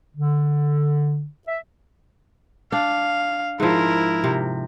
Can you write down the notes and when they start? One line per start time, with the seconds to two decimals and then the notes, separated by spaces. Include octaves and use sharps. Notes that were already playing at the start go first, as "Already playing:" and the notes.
0.16 D3
1.47 E5
2.72 D4 F5
3.60 G#2 F3 E4 A#4
4.24 C3